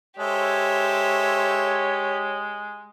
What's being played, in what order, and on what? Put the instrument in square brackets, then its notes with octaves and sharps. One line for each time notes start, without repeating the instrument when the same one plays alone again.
[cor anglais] G#3 [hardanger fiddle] G4 [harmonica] A4 C5 E5 [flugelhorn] C#5